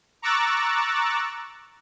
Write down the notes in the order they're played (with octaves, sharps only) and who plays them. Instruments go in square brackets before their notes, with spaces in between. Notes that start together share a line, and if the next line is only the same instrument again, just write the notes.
[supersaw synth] A#5 C#6 D6 E6 F#6 A6